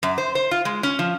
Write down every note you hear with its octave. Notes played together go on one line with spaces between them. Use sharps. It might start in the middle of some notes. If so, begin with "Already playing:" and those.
F#2
C5
C5
F4
G#3
C#4
F3